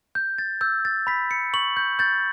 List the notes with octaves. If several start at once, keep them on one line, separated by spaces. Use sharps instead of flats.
G6
A6
E6 G6
A6
B5 B6
C#7
C#6 F#7
G6
G6 A6